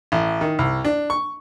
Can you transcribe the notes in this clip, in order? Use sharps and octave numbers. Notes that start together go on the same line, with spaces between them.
A1
D#3
C2
D4
C#6